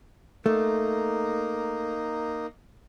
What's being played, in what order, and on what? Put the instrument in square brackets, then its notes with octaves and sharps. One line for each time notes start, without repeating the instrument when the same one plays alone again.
[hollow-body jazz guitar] A3 [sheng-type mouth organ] A#3 D#4